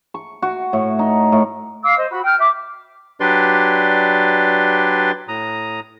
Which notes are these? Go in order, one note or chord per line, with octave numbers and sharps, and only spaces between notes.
C#6
F#4
A2
D#4
A2
F5 D6 E6
C5 D#5
F#4 B5
G5 F6 G6
E5 D6
F#3 D4 G4 B4 D5 C6
A2 A#5 D#6